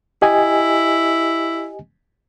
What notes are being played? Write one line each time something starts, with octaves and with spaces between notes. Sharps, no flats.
E4 G4 D#5 G#5